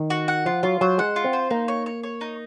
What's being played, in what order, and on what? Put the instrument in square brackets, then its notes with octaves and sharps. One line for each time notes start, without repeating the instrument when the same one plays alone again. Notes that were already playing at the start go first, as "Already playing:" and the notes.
Already playing: [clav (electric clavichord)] D#3
[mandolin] F#4
F#5
[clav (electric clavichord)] F3 [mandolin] F4
[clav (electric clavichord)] F#3 [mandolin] F4
[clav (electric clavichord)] F#3 [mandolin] C5
[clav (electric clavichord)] G#3 [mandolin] F#5
[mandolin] F4
[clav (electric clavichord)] C4
[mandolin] C5
[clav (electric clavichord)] A#3 [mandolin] D#4
[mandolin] C#5
C#5
C#5
D#4